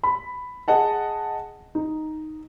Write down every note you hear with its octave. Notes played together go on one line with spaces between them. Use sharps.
B5
G#4 D#5 F#5 A5
D#4